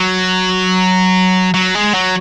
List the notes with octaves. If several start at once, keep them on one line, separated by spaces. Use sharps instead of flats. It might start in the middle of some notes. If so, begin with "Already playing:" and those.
Already playing: F#3
F#3
G#3
F#3